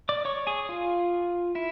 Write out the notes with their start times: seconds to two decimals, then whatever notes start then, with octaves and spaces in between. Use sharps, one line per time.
0.09 D5 D6
0.25 C#5 C#6
0.47 G#4 G#5
0.69 F4 F5
1.55 E4 E5